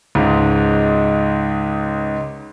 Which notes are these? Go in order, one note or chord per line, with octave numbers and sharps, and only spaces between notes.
C#2 G#2